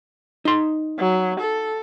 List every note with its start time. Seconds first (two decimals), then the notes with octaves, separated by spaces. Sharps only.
0.45 D#4 C6
0.99 F#3
1.40 A4